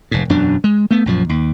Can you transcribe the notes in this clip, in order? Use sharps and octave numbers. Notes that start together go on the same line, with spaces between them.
F1 G#2
E1 F#2 B2 D4
G#3
A3 B3
A#1 F#2 F3
D#2